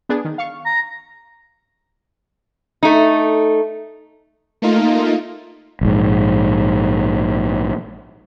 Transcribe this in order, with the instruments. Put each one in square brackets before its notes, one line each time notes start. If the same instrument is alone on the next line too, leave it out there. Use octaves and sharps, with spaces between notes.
[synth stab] B3 D4 G#4
D#3
F5 C#6
[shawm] A#5
[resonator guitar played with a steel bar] A3 D#4
[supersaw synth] A3 A#3 D#4 F4
[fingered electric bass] A#1 G#2